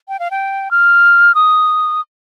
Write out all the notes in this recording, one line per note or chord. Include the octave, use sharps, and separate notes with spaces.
G5
F5
G5
F6
D#6